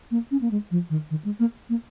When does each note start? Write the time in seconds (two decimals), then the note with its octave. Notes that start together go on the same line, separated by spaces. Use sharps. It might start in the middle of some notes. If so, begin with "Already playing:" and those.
0.11 A#3
0.31 C#4
0.41 A#3
0.51 G#3
0.71 F3
0.90 D#3
1.10 D#3
1.25 G#3
1.40 A#3
1.69 A#3